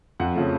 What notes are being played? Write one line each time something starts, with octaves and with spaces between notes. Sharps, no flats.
F2 F#5
C#3 F3 A3